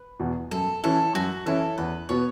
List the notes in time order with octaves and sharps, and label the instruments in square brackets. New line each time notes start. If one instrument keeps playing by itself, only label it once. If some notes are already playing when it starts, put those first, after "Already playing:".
Already playing: [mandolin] B4
[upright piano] E2 B2
[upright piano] F#2 [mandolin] A4
[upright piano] E3 C#4 E4 [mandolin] A4
[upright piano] F#2 [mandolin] F#4
[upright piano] E3 C#4 E4 [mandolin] A4
[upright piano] E2 [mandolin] B4
[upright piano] B2 B3 F#4 [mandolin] C#5